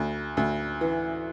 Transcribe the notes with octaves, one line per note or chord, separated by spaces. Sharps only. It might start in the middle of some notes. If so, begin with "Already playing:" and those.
Already playing: D2
D2
E3